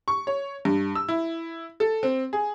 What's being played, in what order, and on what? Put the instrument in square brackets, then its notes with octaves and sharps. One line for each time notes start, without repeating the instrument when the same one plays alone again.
[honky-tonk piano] C#6
C#5
G2
E6
E4
A4
C4
G#4